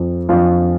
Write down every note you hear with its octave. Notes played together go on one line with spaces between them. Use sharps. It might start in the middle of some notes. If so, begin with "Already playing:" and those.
Already playing: F2 F3
F2 F3 F4